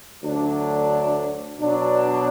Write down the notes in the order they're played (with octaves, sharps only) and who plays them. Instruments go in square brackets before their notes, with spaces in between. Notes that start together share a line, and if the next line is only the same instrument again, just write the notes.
[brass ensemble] D2 D3 F#3 A3 D4
B2 F#3 D4